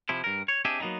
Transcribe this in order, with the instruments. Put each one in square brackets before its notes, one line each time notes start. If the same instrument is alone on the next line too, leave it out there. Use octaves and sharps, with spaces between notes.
[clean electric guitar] C3 F3 E4
G2 A#4
C#5
C4 D4 G4 G#4 D#5 E5
F#3 A#3 B3 C#4 D#4